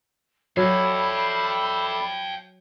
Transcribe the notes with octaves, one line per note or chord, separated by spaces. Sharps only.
F#3 A4 D5 E5 F5 G5 B5